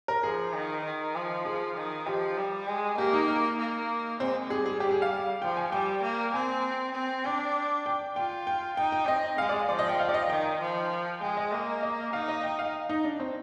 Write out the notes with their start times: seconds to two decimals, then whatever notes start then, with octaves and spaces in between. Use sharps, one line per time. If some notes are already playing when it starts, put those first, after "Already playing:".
0.08 A#4
0.23 F3 G#4
0.53 D#3
0.85 D#3
1.15 F3
1.45 G#4
1.76 D#3
2.06 F3 G4
2.37 G3
2.67 G#3
2.98 A#3 G4
3.13 D#4
3.28 D#4
3.59 A#3
4.20 G#3 C4
4.50 G3 G#4
4.66 G#4
4.80 G4
4.91 G#4
5.02 F5
5.41 F3 G5
5.57 G#5
5.72 G3 G5
6.02 A#3
6.33 C4 G#5
6.95 C4
7.25 D4 G5
7.86 G5
8.16 F4 G5
8.47 G5
8.77 D#4 G5
8.92 G5
9.07 C4 D#5
9.38 G#3 F5
9.49 D5
9.69 F3 D5
9.79 D#5
9.89 G5
9.99 F5
10.09 D5
10.14 D#5
10.30 D#3 G5
10.61 F3
11.21 G#3 G5
11.37 D#5
11.52 A#3 D#5
11.83 D#5
12.13 D#4 F5
12.28 D#5
12.43 G5
12.59 F5
12.89 D#4
13.04 D4
13.20 C4